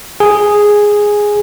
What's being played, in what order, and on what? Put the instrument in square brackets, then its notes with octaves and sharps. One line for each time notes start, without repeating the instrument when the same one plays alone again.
[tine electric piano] G#4